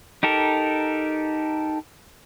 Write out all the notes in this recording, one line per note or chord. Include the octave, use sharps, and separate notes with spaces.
D#4 G4 A4 A#4